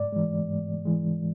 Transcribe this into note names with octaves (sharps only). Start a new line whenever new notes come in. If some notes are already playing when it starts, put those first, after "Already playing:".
Already playing: G#2 D5
E3 G#3
G#2
E3 G#3